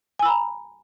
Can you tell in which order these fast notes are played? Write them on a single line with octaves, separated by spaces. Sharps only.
G#5 E6 B5 A#5